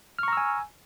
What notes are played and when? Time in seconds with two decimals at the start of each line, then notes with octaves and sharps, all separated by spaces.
0.19 F6
0.23 C#6
0.28 A#5
0.33 E6
0.37 G#5